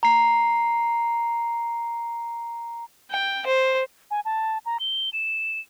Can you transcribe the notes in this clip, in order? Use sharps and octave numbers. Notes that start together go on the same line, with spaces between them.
A#5 C7
G5
C5
G#5
A5
A#5
G7
E7